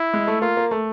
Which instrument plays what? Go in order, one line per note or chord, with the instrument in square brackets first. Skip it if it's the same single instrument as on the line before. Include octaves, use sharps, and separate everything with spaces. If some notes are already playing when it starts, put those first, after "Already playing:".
Already playing: [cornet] E4
[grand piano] G#3
A3
[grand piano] A#3 [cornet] F4
[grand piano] A#3
A3